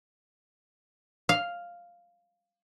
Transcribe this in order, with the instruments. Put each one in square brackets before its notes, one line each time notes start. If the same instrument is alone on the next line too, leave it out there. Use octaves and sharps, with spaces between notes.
[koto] F5